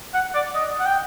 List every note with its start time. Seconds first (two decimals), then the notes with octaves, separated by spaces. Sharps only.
0.14 F#5
0.35 D5
0.55 D#5
0.80 F#5
0.86 G5